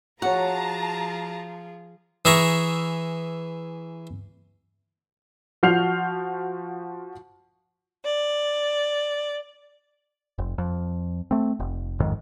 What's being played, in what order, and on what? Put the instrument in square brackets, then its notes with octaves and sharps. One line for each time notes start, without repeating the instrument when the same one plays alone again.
[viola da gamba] F3 F4 G#4 [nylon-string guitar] F#4 C#5 [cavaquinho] F#5 [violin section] A5 A#5
[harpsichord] E3 G#4 E5 A#5 C#6
[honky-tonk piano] F3 F#4 F6 G6 C7 F7
[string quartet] D5
[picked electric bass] F1
F2
A3 C4
F1
A1 F2 G#2 D#3